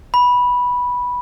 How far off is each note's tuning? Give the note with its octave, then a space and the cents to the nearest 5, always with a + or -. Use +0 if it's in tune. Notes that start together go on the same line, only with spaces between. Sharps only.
B5 -10